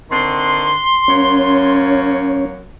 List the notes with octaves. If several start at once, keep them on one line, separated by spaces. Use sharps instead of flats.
D3 D#3 C4 C6
F#2 A#3 C#4 C#5